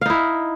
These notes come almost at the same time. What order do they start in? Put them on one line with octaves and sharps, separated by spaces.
F5 D#4 E4